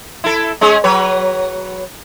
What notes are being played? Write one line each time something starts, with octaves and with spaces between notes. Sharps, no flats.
E4 A4
G#3 C#4 G#4
F#3 B4 C#5